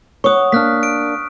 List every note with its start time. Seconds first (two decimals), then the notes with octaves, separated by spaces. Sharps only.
0.24 C#5 F#5 C#6 D#6
0.52 A#3 D4 F6 F#6 B6
0.83 D7